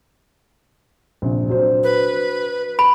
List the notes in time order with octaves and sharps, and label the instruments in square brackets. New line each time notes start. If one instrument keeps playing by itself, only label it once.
[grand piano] A#1 C3
F#3 D4 C5
[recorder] B4
[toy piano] B5 [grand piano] D7